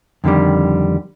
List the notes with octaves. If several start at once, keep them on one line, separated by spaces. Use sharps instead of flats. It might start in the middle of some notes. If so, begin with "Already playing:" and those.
F2 D3 D#3 G3